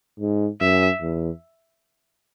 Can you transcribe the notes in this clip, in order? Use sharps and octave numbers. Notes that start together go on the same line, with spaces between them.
G#2
F#2 E5
E2